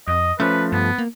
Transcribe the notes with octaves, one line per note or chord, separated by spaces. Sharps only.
F2 D#5
F3 A3 C#4 B4
G2 B3
A#3